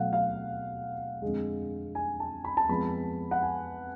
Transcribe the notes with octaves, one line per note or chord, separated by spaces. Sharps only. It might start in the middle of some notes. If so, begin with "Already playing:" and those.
Already playing: B2 F#3 A3 F5 F#5
F5
F2 D3 G#3
G#5
A5
B5
A5
F2 F3 G#3 B3 B5
F#5
G#5